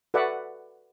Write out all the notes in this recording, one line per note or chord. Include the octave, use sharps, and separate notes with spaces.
F#4 A4 B4 D5 E5 F#5